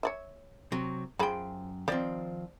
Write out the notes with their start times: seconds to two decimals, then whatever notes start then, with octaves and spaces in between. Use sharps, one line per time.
0.03 C#5 D5 E5
0.72 C3 F#3
1.19 F#2 F3 G#4 G5 B5
1.88 D#3 F3 C4 C5 D5